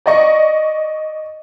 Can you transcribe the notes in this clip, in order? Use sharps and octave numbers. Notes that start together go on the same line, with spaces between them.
D5 D#5 C#6